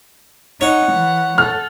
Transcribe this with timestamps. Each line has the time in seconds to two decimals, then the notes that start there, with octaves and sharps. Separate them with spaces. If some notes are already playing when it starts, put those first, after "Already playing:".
0.61 D#4 C#5 F#5
0.92 E3
1.38 A4 F6